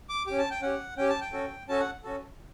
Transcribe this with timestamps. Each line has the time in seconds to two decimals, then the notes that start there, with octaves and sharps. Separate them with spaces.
0.09 D6
0.27 C#4 G4 D6
0.38 A5
0.50 G5
0.62 C#4 G4 F#5
0.97 C#4 G4 G5
1.09 A5
1.21 G5
1.33 C#4 F#4 A4
1.68 C#4 F#4 A4 A5
1.80 F#5
2.04 C#4 F#4 A4